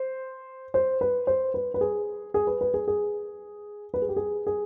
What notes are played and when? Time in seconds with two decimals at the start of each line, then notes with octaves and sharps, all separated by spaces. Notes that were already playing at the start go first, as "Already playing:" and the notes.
Already playing: C5
0.74 C5
1.01 B4
1.27 C5
1.54 B4
1.74 B4
1.81 G#4
2.34 G#4
2.47 B4
2.61 B4
2.74 G#4
2.88 G#4
3.94 B4
4.02 G#4
4.09 G4
4.16 G#4
4.47 G#4